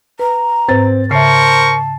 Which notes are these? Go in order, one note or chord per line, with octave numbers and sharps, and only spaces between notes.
B4 A#5
G#2 C4 B4 A6
C#3 A#4 C5 E5 A5 C#6 C7